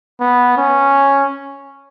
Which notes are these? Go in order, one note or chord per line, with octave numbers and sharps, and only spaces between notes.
B3
C#4